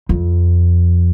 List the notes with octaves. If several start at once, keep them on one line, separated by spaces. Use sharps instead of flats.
F2